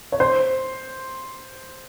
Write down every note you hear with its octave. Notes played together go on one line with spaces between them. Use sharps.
C#5
C5